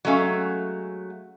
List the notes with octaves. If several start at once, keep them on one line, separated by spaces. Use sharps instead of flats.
F#3 G#3 A3 C#4 F5